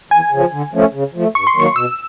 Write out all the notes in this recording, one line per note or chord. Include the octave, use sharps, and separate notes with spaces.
E2 G#5
C#3 F3
D3
F3 A3 C#4
C#3
F3 A3
G2 C#6
C6
D#3 F#3 A#3 C#6
B2 E6